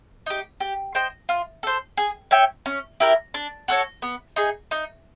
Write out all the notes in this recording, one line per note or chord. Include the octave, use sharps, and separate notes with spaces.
D#4 G4
G4
C5 D#5 G5
F4
A4 C5
G#4
C#5 E5 G5
C#4
E4 G4 A#4
D4
F#4 A4 C#5
B3
D#4 G#4
D#4